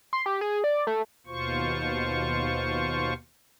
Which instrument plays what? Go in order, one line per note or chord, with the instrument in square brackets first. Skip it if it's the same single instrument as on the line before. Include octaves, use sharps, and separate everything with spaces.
[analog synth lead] C6
G4
G#4
D5
A3
[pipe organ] D#2 B2 F4 C5 C#6